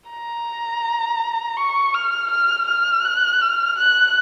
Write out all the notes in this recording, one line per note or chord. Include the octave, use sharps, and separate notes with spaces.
A#5
C#6
F6
F6
F6
F#6
F6
F#6